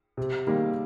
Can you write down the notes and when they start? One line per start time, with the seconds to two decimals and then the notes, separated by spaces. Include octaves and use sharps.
0.17 C3
0.47 D#3 G3 A#3